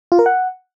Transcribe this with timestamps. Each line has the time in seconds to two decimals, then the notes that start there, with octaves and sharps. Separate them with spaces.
0.12 F4
0.19 A#4
0.26 F#5